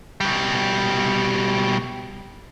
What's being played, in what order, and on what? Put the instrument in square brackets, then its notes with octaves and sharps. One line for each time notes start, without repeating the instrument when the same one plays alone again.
[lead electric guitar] B2 G3